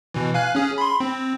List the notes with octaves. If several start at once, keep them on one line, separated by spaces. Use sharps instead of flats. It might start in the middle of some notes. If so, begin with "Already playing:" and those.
B2 E3
F5 G#5 F#6
C#4 G#4
B5 C6
C4